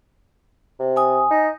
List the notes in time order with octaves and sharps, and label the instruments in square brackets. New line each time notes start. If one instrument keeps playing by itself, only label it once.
[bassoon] C3
[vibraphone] G#5 D#6
[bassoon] D#4